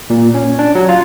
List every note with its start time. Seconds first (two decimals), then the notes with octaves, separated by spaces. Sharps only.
0.10 A#2
0.34 C#4
0.59 D4
0.75 F#3
0.89 F4